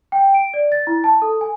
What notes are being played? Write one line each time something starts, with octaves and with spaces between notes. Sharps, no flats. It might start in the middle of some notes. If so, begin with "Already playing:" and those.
G5
D7
D5
A6
E4
A5
A4
G#5